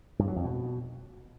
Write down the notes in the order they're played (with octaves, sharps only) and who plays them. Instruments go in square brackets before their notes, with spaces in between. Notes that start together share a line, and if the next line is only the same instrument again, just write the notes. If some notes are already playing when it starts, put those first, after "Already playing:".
[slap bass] G2
F#3
F2
B2